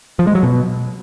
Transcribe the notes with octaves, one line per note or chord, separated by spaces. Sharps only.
F3
G#3
F#3
B2